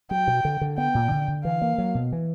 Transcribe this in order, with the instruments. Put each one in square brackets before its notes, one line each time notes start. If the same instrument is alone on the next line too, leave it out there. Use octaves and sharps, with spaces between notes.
[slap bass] F#3 [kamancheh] G5
[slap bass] B2
D3
D3
[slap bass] B3 [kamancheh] G5
[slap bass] A#2
D3
D3
[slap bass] E3 [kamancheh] F5
[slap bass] A#3
F#3
B2
E3